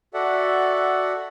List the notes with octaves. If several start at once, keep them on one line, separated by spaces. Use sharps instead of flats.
F#4 A4 D5 E5 F#5